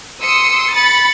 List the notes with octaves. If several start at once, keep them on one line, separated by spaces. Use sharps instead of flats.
C6 D#6 E6 C#7
B5 A6 C#7